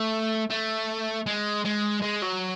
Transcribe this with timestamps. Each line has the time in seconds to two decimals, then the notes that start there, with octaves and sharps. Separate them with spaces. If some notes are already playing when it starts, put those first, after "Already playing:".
Already playing: A3
0.50 A3
1.26 G#3
1.65 G#3
2.02 G#3
2.22 F#3